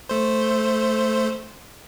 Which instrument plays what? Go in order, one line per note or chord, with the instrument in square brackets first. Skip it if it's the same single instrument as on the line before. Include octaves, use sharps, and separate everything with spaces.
[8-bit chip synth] A3 C5